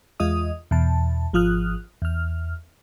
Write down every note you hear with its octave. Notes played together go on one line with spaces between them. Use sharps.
E2 G#3 F4 D#5 D#6
E2 B2 A5
G#1 F3 F4 D#6 F6 F#6
E2 F6